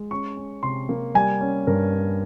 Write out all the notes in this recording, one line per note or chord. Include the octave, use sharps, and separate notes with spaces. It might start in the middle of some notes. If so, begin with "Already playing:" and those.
Already playing: G#3
C#4 C#6
C#4
C3 C6
A#3
G3 G#5
C#4
G2 A#4
C#4